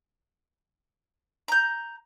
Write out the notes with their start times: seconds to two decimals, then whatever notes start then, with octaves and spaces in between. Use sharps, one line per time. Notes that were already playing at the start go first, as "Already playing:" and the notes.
1.48 A#5 G6